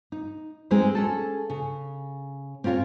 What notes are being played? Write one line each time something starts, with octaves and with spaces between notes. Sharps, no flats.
D#4
G#3 C4 D#4 C5
C#4 G#4 A4
C#3
C4 C#4 F4 A#4 C#5